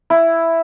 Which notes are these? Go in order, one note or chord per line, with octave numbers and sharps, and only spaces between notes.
E4